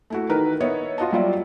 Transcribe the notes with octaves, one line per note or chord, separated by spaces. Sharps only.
A3 E4 F#4
D#3 E3 D#4 A#4 B4
B3 C#5 D#5 E5
F4 F#4 D#5 A5
F#3 G3 F4 D5 E5